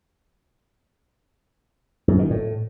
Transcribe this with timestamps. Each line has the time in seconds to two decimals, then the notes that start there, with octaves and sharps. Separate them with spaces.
2.08 F#2
2.19 D#3
2.30 A2